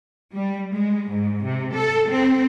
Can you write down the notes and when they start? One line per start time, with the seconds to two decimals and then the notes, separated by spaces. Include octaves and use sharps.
0.34 G3
0.72 G#3
1.11 G#2
1.44 C3
1.74 A4
2.09 C4